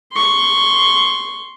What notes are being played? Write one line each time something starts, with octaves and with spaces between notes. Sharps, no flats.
C6 C#6